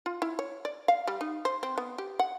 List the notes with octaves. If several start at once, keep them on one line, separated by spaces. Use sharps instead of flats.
F4
E4
C#5
D5
F5
G3
D#4
C5
C4
B3
G4
F#5